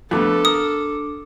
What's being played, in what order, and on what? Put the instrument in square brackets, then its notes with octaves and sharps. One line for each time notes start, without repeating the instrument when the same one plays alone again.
[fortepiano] F2 A3 B3 [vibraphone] D4 D6 [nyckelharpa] A4
[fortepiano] A#4 [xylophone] D#6